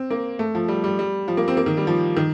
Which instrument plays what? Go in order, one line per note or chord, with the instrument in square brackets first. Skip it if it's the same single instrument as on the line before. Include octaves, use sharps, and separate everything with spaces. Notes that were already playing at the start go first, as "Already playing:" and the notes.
Already playing: [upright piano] C4
A#3
A3
F3
G3
G3
G3
F3
A#3
C4
A#3
D#3
G3
F3
D#3